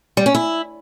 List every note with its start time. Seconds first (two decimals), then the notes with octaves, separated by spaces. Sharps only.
0.17 G3
0.26 C#4
0.35 E4